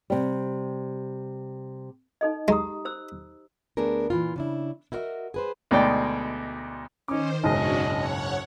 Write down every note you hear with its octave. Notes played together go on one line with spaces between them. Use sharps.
C3 G3
D#4 A4 D#5
G#3 G4 A#5 D#6
C5 E6
D2 A3 B3 D4 G#4 A#4
A#2 E3 F4
C#3 D4 E4
E4 F#4 A#4 C#5 D#5 E5
G#4 B4 C5
D2 B2 G#3 D#4 D5 G5
D#3 C#4 D#4 C5 D6
F#1 B1 G#2 C#4 D4 F#4 D#5
C#5 F#5